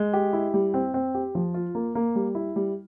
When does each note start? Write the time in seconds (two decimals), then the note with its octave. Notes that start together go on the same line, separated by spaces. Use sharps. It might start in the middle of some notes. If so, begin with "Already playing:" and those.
Already playing: G#3
0.13 G4
0.33 E4
0.54 G3
0.74 C4
0.94 C4
1.14 G4
1.35 F3
1.54 F4
1.75 A#3
1.95 A#3
2.15 G3
2.35 E4
2.56 G3